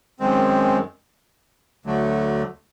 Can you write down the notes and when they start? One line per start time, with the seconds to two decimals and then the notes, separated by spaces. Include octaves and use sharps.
0.20 F#2 D#3 G#3 C4
1.85 D2 D3 F#3 A3